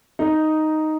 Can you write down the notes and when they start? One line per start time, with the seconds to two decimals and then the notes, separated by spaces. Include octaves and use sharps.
0.19 D#4